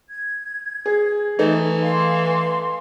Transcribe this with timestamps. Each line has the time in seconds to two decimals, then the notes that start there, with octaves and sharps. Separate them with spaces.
0.10 G#6
0.86 G#4
1.39 E3 A3 D#4
1.82 F5 C6